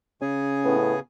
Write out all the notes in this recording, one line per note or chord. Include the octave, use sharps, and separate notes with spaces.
C#3 C#4 G#4 G#5
A2 B3